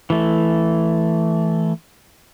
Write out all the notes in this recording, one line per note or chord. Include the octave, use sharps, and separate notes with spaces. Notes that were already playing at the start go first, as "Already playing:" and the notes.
E3 A3